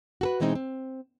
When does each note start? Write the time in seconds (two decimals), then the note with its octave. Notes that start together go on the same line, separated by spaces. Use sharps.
0.21 F#4 A4 B4
0.40 B2 E3 G#3 C4 D#4
0.55 C4